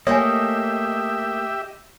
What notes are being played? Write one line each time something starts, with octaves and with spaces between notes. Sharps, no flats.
A3 A#3 G4 C#5 D#5 E5 G#5